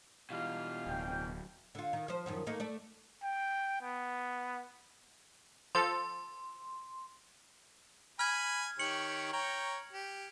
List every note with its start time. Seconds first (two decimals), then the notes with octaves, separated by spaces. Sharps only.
0.30 B2 E3 G3 F4 F5
0.86 D1 C#4 G5
1.75 D3 F4
1.93 D#3
2.08 F3 C5
2.26 F#2 D#3 F3
2.47 A3 A#3 D#4
2.60 A3 D5
3.23 G5
3.82 B3
5.75 F3 A4 C6
8.19 G#5 B5 F6 G#6
8.79 D#3 G4 C#5 C#7 F#7
9.33 C#5 G5 A#5
9.93 G4